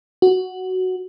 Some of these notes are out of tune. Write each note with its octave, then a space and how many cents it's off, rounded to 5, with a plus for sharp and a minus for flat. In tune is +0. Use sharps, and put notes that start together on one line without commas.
F#4 +5